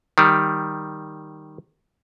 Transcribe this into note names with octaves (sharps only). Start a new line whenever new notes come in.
D#3 G3